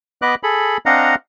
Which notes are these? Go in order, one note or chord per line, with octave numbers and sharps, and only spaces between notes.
B3 B4 D#5 D6 F#6
G#4 A4 B5
C4 D4 D#5 F5 F#5 A#5